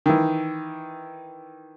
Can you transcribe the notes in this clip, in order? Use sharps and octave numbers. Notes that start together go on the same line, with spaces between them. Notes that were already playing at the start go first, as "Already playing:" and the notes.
D#3 E3